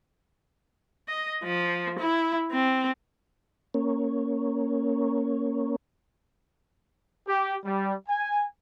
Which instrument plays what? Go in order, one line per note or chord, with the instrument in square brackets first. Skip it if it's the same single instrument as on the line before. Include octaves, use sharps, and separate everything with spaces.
[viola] D#5
F3
E4
C4
[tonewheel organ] A#3 C#4
[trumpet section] G4
G3
G#5